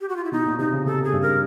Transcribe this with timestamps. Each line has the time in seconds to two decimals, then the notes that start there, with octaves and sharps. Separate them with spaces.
0.01 G4
0.09 F#4
0.16 F4
0.25 E4
0.32 B2 D#4
0.45 A#2
0.59 C3 D#4
0.72 C#3
0.85 C3 A4
1.04 G#4
1.13 G2
1.22 A#4